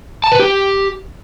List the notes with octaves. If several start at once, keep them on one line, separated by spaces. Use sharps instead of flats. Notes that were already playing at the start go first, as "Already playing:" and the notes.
A5
B4
G4